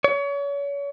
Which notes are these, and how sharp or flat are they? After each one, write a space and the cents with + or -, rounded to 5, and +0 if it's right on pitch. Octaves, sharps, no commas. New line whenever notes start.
C#5 +35